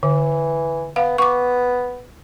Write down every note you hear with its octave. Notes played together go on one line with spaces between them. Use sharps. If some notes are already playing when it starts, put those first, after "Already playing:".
D3 E3
B3 F5
B3 C#6 D6